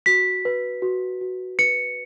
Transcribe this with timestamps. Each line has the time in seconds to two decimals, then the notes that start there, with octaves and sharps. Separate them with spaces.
0.06 F#4 B6
0.45 B4
0.82 F#4
1.21 F#4
1.59 B4 C#7